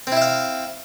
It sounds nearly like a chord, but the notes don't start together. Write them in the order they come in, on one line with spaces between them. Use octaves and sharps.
C4 E4 E5 F5